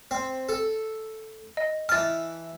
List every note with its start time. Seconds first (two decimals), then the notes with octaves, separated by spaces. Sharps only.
0.11 C4
0.49 A4
1.57 D#5
1.89 E3 A5 F6 A6